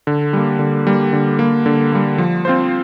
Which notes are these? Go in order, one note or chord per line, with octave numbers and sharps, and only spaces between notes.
D3
G3 A#3
D3
G3 A#3
D3
G3 A#3
D3
G3 A#3
F3
C4 F4 C5